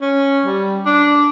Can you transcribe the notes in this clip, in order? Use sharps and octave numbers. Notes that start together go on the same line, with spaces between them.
C#4
G3
D4